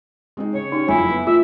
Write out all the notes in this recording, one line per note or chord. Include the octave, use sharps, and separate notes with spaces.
G#3 C4 D#4
C#3 C#5
C#4 D#4 G4
F#1 F2 E4 G#5
B3
A3 F4 E5